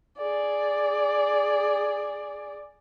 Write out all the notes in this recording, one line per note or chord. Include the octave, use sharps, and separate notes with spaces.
G#4 D5